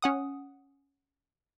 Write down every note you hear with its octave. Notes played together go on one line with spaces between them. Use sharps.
C#4 F#5 D#6